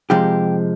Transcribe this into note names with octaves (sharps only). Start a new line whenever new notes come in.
F2 C3 F3 G#3 G4